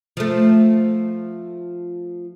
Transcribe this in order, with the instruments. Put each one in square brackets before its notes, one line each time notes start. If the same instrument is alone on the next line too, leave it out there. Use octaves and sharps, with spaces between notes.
[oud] F3 A3